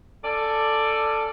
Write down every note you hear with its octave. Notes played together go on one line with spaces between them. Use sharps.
C#4 A4 D5